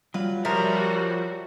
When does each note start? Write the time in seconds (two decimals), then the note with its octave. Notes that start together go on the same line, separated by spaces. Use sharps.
0.14 F#3 G3 F4 B4
0.45 F3 G3 F#4 A#4 C#5 E5